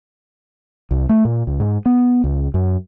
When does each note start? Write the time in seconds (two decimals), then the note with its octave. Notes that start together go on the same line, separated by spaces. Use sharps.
0.91 C2
1.09 A3
1.25 A#2
1.47 C#2
1.60 G#2
1.86 B3
2.24 C#2
2.54 F#2